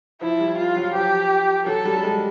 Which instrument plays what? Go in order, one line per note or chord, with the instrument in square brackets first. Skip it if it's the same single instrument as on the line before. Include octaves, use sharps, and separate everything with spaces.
[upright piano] F3 [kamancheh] E4
[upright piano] G3
[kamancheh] F4
[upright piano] F#3
[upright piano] F3 [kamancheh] G4
[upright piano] F#3 [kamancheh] A4
[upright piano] G3
G3
G#3